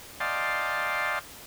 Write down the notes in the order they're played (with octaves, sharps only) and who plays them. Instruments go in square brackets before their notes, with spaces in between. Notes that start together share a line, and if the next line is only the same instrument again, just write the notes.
[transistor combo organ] D5 D#5 F5 G5 A5 C6